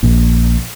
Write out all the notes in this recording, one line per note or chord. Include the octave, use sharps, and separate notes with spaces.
A#1